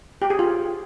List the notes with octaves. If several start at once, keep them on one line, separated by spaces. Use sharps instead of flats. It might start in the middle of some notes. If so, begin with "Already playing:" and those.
G4
G#4
F4